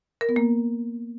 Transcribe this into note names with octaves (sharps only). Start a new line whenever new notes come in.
A#4
B3
A#3